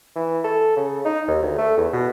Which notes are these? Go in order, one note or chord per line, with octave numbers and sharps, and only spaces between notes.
E3
A4
C#3
D#4
D#2
D2
A3
E2
B2